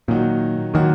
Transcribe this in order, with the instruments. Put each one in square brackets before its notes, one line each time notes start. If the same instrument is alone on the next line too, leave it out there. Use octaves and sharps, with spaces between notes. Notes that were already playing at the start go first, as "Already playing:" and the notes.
[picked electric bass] A#2 [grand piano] D#3 F#3 D#4 F#4
[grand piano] A#2 F#3 D#4 F#4 [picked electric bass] D#3